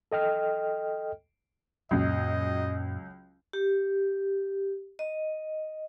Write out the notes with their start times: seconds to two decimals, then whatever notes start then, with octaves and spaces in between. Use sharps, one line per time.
0.12 A4 D#5 G5 F6
1.91 C#2 F#2 A#2 F#3 A#3 D#5
3.53 G4
4.99 D#5